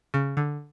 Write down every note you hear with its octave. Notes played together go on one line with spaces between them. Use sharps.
C#3
D3